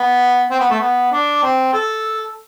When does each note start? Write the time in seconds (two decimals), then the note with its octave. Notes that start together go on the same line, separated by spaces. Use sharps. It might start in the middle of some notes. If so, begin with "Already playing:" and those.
Already playing: B3
0.50 C4
0.60 B3
0.70 A3
0.80 B3
1.12 D4
1.43 C4
1.73 A4